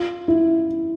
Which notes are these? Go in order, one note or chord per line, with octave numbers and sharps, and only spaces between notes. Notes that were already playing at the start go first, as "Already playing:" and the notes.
Already playing: F4
E4